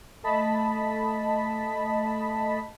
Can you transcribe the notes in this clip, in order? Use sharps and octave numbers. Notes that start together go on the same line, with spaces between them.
A3 D#5 A5 B5 B6